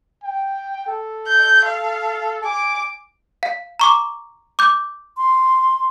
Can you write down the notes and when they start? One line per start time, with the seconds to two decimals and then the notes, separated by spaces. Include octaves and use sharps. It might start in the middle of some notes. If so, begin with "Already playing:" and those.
0.23 G5
0.87 A4
1.28 G6
1.66 F5
2.44 G#5 D6
3.43 F5
3.80 A#5 C#6 D6
4.59 D6 G6
5.17 C6